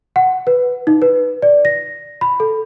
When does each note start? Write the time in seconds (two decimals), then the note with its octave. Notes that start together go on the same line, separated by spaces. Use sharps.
0.16 F#5
0.47 B4
0.87 D#4
1.02 B4
1.42 D5
1.65 A#6
2.21 B5
2.40 A4